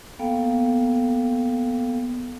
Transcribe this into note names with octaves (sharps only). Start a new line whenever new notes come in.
A#3 B3 A4 F5 G5